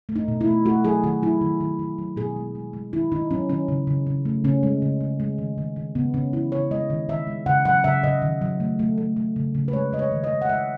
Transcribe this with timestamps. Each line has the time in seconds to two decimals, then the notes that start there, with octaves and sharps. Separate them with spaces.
0.09 A3
0.16 D#4
0.28 B2
0.41 E4
0.47 A3
0.66 A3 F#4
0.85 F#3 G#4
1.03 D#3 F#4
1.22 F#3 E4
1.41 D#3
1.60 D#3
1.79 D#3
1.99 F#3
2.17 B2 G#4
2.36 G#3
2.55 G#3
2.73 G#3
2.93 D#3 E4
3.12 D#3 D#4
3.31 F#3 C#4
3.49 D#3 C#4
3.68 C#3
3.87 C#3
4.07 C#3
4.25 A3
4.44 C#3 C#4
4.63 G#3
4.82 C#3
5.01 C#3
5.20 G#3
5.38 D#3
5.58 D#3
5.76 D#3
5.95 C#3 B3
6.14 C#3 C#4
6.33 E3 E4
6.52 C#3 C#5
6.71 G#3 D#5
6.90 D#3
7.09 D#3 E5
7.27 G#3
7.46 C#3 F#5
7.65 F#3 F#5
7.84 C#3 E5
8.03 C#3 D#5
8.22 D#3
8.41 F#3
8.60 A3
8.79 A3
8.98 A3
9.16 A3
9.36 C#3
9.55 C#3
9.68 B4
9.73 G#3 C#5
9.92 G#3 D#5
9.99 C#5
10.12 D#3
10.24 D#5
10.30 G#3
10.42 F#5
10.49 G#3 E5